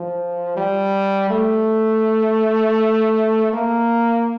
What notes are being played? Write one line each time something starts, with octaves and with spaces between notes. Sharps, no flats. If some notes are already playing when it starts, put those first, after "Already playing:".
Already playing: F3
G3
A3
A#3